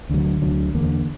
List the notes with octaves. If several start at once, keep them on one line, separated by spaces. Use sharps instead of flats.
D2 D3 F#3
D2 D3 F#3
E2 D3 A#3